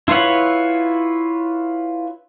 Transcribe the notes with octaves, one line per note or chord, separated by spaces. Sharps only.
E4 F4 B4 C#5 F#5